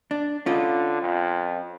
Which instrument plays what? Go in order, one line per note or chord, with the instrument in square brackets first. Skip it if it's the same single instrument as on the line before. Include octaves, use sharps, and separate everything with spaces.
[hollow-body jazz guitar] D4
[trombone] D3 [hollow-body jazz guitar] C#4 F4
[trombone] F2